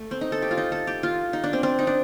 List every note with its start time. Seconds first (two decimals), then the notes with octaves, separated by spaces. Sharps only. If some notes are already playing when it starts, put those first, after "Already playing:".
Already playing: A3
0.11 C4
0.21 D#4
0.32 A4
0.42 G4
0.51 F4
0.57 D#4
0.72 A4
0.87 G4
1.03 F4
1.33 D#4
1.44 D4
1.53 C4
1.63 C4
1.79 D#4
1.87 D4